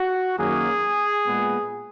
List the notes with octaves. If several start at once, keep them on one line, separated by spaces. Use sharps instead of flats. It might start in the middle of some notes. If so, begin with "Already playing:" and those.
Already playing: F#4
F#2 D#3 F#3 A#3 G#4
A#2 G#3 B3